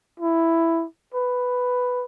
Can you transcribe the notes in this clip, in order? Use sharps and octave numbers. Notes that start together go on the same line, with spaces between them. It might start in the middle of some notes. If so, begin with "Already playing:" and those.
E4
B4